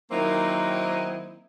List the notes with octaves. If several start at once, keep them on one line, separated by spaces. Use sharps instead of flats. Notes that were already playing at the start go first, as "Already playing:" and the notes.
D#3 F#3 A#3 C4 D#4 E4